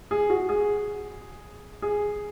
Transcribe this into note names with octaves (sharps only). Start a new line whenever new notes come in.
G#4
F#4
G#4
G#4